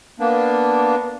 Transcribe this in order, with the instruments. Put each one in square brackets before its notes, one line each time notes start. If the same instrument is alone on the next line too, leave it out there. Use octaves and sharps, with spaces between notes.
[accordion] A#3 B3 D4